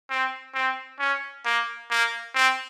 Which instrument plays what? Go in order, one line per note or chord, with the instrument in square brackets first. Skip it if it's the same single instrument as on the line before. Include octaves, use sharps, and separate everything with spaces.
[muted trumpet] C4
C4
C#4
A#3
A#3
C4